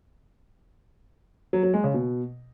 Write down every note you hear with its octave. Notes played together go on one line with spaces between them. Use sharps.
F#3
F#3
G#3
C#3
B2